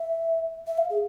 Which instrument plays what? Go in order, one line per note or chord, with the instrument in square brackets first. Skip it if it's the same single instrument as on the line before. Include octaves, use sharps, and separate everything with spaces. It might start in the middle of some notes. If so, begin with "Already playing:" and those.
Already playing: [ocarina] E5
E5
F5
G#4